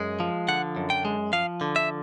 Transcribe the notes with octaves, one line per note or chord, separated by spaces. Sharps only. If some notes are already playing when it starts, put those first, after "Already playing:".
Already playing: F#2 G#3
F3
D3 F#5
F#2
G5
G#3
F3 F5
D3
E5